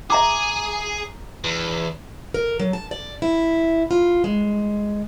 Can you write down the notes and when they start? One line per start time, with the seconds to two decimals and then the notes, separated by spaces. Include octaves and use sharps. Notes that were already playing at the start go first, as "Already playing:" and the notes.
0.10 G#4 E5 A#5 D6
1.44 E2
2.34 A#4
2.60 F#3
2.73 A5
2.91 D5
3.22 E4
3.91 F4
4.24 G#3